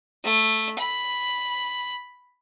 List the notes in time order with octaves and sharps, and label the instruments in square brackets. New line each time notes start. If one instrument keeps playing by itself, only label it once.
[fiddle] A3
B5